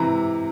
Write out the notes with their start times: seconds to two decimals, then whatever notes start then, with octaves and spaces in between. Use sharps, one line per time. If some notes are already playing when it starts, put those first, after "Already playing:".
Already playing: C3 E3 A#5 B5